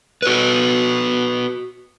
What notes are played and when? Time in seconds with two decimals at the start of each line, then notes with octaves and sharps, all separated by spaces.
0.22 F#4 A4 B4